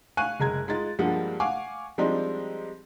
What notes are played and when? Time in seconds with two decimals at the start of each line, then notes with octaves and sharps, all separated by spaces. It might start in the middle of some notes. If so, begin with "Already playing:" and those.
0.17 F5 G#5 C#6 F#6 D#7
0.40 F#1 G#3 A#5 G#6
0.68 G#3 D#4 F4 A6
0.99 G2 F3 G3 G#3 A#3 F#5
1.40 F5 F#5 G#5 C#6 D6
1.98 F3 G3 G#3 C4 D4 D#4